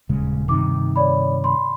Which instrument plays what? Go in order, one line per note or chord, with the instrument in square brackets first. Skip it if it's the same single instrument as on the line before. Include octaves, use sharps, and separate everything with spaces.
[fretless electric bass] D#1 C#3 G#3
[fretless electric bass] G2 C3 D#3 [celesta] D#4 D6
[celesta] C#5 D5 B5
B5 C6